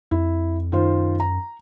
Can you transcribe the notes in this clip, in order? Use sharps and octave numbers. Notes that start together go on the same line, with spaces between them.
F2 E4
F#2 D#3 F4 C5
A#5